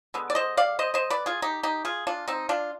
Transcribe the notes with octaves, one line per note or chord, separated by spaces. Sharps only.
D3 G#3 B3
D5
C5 D#5
D5 F5
C5 D#5
C5 D#5
B4 D5
F4 G#4
D#4 G4
D#4 G4
F4 G#4
D4 F4
C4 D#4
D4 F4